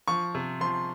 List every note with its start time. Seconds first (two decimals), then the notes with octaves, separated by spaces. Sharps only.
0.08 F3 C#6
0.35 C3
0.61 F3 C6